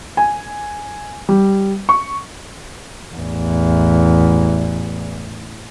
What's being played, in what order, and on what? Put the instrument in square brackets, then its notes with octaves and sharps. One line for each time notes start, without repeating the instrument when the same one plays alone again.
[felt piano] G#5
G3
C#6
[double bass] A1 E2